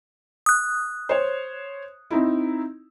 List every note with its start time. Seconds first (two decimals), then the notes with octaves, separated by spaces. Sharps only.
0.46 D#6 F#6
1.09 C5 C#5
2.11 C4 D#4 E4